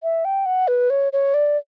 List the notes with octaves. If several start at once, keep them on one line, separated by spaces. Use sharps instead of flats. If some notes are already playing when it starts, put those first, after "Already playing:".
E5
G5
F#5
B4
C#5
C#5
D5